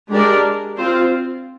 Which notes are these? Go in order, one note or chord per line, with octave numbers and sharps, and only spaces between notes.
G#3 D4 G4 A#4 D5
C4 F4 C5